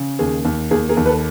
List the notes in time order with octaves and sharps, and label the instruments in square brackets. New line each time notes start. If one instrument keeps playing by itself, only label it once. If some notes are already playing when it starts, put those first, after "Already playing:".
Already playing: [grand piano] C#3
D#2 G#4
D#2
D#2 G#4
G#4 A#4
D#2
A4 B4